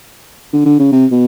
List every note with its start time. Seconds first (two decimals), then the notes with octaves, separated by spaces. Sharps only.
0.53 D3
0.65 D3
0.79 C#3
0.92 C3
1.11 B2